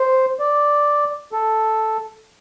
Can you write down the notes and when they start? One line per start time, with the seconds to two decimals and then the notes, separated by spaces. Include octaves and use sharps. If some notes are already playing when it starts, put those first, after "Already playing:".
Already playing: C5
0.39 D5
1.32 A4